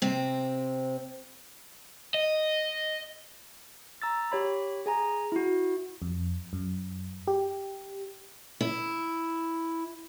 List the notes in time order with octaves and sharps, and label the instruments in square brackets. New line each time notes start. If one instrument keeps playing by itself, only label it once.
[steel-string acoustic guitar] C3 C4
[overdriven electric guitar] D#5
[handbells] A#5 E6 A6
G4 C#5 B5
G#4 G#5 A#5
E4 F#4
[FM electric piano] F2
F#2
G4
[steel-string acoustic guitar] E4